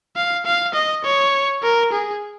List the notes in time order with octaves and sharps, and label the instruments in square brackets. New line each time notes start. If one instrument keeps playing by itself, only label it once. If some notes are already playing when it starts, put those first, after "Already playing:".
[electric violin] F5
F5
D#5
C#5
A#4
G#4